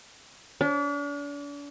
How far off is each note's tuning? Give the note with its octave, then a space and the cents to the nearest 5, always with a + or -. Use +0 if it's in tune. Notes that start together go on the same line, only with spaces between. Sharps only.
D4 -40